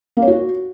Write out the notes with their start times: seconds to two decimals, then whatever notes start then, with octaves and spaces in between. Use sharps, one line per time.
0.17 A#3
0.22 C#5
0.28 F#4